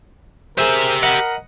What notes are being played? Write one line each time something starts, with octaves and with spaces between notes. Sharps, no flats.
G4 G#4 A#4 C5 E5
A#4 D#5 F#5 B5